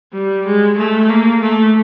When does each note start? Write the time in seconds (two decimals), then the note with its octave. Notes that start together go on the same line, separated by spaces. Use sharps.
0.13 G3
0.46 G#3
0.78 A3
1.09 A#3
1.41 A3